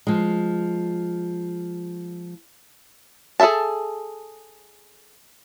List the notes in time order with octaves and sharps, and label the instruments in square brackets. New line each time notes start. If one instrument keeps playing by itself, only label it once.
[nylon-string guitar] F3 G#3
[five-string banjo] G#4 A4 C5 E5 A5